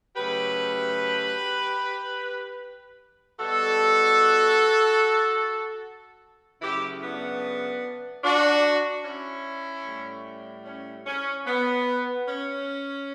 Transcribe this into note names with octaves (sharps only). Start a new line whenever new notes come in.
C#3 F#3 A3 G4 B4
B2 G3 F#4 A4
C#3 F#3 A3 E4 G4
B3 D4
D4 F#4
C#4 E4
A2 G3
C#4
C#4
B3
C#4